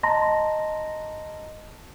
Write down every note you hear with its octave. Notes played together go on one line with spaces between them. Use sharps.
D#5 A5 A#5 C6 A#6